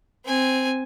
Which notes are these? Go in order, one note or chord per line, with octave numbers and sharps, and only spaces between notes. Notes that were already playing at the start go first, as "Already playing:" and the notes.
C4 G#5